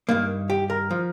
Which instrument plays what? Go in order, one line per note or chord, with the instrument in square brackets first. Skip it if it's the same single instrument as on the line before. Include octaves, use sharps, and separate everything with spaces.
[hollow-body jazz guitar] G2 D#3 A#3
G4
A#4
F3